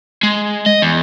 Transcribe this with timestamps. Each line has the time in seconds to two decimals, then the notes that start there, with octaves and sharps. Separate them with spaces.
0.23 G#3
0.66 D#5
0.82 E2